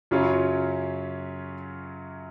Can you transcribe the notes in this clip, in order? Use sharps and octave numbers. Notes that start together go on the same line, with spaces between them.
F#2 C#3 F#3 C#4 F4